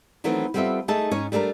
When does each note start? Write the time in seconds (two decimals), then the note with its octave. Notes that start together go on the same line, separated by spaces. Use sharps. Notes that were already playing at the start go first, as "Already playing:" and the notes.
0.24 D#3 E3 F#3 A3 B3 C4
0.54 G3 B3 C4 F4 A4 E5
0.88 A3 D#4 G#4 E5 A5
1.11 G#2 C#4 D#4 C#5
1.32 G3 A3 D4 A4 A#4